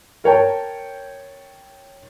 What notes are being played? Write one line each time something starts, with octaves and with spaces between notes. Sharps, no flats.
A#4 C#5 G5 A5